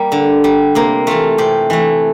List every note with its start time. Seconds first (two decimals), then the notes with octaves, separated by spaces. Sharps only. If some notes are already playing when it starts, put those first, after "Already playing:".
Already playing: G3 A#3
0.12 D3
0.44 G3
0.75 C3 A#3
1.07 E3 A3 F4
1.38 C3 G4
1.70 E3 A3